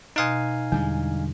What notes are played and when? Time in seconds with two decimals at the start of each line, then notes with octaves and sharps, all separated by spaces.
0.16 B2 D#4 F5 G#5 C6 F#6
0.72 E2 D3 G3 G#3